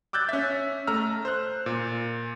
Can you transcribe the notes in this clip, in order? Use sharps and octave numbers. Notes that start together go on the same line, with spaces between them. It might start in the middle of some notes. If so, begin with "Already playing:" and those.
D6 E6 F#6 G6 A6
C#4 E5
A3 A#5 E6 F6
C5 F#6
A#2